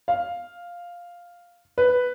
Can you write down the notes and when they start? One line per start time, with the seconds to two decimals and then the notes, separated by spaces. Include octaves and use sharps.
0.08 F5
1.78 B4